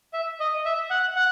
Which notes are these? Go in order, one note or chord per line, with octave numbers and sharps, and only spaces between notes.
E5
D#5
E5
F#5
F#5